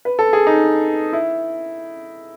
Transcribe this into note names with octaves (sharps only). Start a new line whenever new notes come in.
B4
A4
G#4
D#4
E4